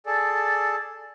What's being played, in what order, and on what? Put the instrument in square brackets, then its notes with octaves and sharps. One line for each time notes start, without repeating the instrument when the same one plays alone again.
[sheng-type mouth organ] G#4 A4 D5